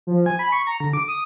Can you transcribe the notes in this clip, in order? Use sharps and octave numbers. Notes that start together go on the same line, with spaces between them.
F3
G#5
B5
C#6
A#5
D3
D6
D#6